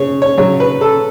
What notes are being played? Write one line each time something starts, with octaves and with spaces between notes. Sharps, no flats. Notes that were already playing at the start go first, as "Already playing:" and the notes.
Already playing: C#3 G#4 C#5
C#5
C#3 F#3 C#5
B4
A4